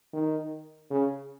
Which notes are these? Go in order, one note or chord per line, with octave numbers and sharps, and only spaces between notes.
D#3
C#3